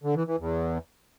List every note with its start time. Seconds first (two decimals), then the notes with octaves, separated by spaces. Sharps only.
0.03 D3
0.15 E3
0.27 E3
0.39 E2